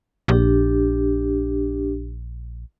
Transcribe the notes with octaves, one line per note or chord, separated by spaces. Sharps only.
A#1 D4 G4